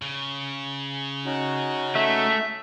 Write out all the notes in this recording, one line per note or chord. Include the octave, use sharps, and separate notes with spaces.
C#3
C#4 D#4 F#4
A3 E5